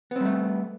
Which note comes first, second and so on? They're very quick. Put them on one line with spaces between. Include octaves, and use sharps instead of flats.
B3 C4 G3 A3